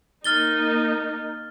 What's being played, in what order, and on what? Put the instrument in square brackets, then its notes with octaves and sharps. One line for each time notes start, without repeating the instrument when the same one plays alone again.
[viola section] A#3 D#4 [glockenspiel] F6 A6 G7